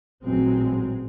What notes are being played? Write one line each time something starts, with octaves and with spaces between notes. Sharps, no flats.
A1 A#2 F#3 G#3 C4